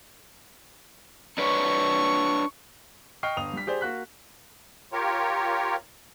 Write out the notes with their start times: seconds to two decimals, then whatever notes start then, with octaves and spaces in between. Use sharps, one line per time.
1.38 D4 B4 C#5 C#6
3.23 D#5 G5 C#6 F6 C7
3.37 G1 D#6 F7
3.53 G3 B6
3.67 G4 G#4 C5 D5
3.81 A#3 F#4 F#6 B6
4.93 F4 G4 A#4 C#5